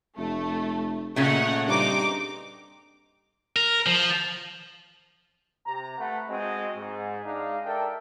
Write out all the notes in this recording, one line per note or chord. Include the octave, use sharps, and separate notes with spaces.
F1 A3
A#2 C#3 A3 C#5 D#5 F#5
G2 C4 D#4 D6
A#4
F3
C3 A#5
A3 B4 F#5
G#3 C4 F#4 D#5
G#2
G#3 D4 D#4 F5
A4 A#4 D5 E5 G5